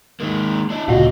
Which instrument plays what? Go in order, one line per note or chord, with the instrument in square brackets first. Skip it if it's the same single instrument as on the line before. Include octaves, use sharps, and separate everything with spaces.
[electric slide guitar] D#3 G#3 A#3
D4 E4
[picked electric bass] D1 A#2 C#3 [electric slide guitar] F#2 F#3 D#5 [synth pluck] F4 F#4